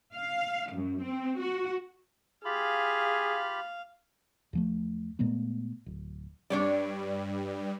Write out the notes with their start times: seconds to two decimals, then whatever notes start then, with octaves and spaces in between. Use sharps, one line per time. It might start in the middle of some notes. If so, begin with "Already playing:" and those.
0.13 F5
0.73 F#2
1.02 C4
1.40 F#4
2.45 F4 G4 G#4 F5 B5
4.53 E2 F3 A3
5.19 A#2 G#3 A3 B3
5.86 D1
6.50 G2 G3 D4 C#5 D5